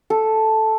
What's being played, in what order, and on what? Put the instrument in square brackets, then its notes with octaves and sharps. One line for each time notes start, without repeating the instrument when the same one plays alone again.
[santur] A4